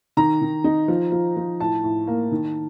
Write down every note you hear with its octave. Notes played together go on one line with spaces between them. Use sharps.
D#3 A#5
D#3
D#4
F3
F3
F3
A2 A5
A2
A#3
D#3